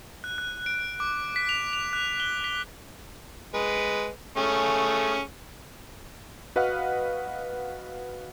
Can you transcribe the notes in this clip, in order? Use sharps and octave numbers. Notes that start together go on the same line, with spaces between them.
F#6
F#6
D7
D6
B6
F7
F7
F#6
G7
B6
G#3 B4
A3 C#4 G#4
F#4 B4 D#5 F5 F#5 F6